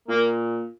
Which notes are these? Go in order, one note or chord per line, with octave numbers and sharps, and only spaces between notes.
A#2 A#3